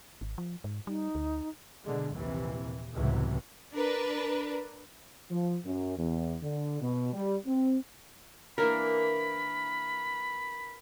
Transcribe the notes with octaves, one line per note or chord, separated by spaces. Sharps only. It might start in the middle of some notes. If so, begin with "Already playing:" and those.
G#1
F3
G#2
G3 D#4
D2
B2 D3 G#3
A#1 D#2 C3 E3
C#2 F#2 A2 C3 E3 F#3
D4 A#4 B4
F3
F#2
E2
D3
B2
G3
C4
E3 A#3 D4 A#4 B5